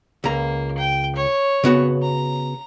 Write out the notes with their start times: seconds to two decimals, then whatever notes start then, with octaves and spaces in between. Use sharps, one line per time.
0.24 C#2 A#3 A#5
0.78 G5
1.16 C#5
1.64 C#3 B3 F#4
2.02 A#5